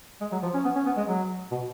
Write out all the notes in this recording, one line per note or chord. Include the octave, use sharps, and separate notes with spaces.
G#3
F#3
F3
C#4
B3
C#4
B3
G#3
F#3
B2